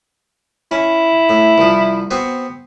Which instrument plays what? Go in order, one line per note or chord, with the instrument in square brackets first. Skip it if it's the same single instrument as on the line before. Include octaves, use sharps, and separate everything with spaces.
[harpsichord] C#4 [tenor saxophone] E4
[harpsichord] A2
C2 F3
B3 C4 F#4